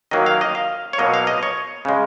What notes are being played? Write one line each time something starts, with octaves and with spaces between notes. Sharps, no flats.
D#3 F#3 A#3 D#5
F5
D#5
F5
C#5
B2 F#3 A#3 D#5
F5
D#5
C#5
C#3 G#3